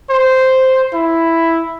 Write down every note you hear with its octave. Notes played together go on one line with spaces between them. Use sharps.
C5
E4